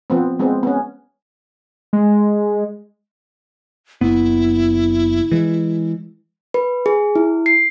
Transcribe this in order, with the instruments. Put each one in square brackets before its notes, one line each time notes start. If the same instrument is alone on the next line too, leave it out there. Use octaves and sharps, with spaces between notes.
[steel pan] F3 B3 C4
G#3 B3 C4
B3 C#4
[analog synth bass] G#3
[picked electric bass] F#1 B3 [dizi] E4
[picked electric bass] E3 G#3
[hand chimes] B4
G#4
E4
C7